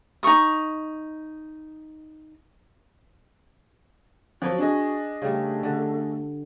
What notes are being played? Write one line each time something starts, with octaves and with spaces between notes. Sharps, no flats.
D#4 A4 C#6 D#6
F3 F#3 F#4
D4 G#4 D#5
C#3 G3 A3
D3